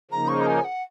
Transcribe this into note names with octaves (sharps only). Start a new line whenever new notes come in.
C#3 F3 A#3 D#4 A#5
C#6
A#5
G#5
F#5